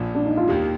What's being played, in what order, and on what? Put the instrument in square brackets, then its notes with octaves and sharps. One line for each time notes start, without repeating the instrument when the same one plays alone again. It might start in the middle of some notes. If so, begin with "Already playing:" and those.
Already playing: [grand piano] A#1 A#2 F3
[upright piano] D4
D#4
F4
[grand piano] D#2 D#3 A#3 [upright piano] G4